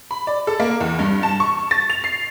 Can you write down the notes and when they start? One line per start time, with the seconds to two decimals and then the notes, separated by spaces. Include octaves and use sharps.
0.11 B5
0.27 D5
0.47 A4
0.60 A#3
0.81 E2
0.99 G2
1.23 A5
1.40 C#6
1.71 A6
1.90 F7
2.04 C7